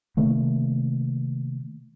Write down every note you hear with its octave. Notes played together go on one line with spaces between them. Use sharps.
C3 D#3 A3 A#3